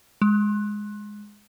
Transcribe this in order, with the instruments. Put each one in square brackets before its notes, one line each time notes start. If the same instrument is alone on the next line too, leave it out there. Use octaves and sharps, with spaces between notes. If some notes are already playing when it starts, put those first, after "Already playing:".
[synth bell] G#3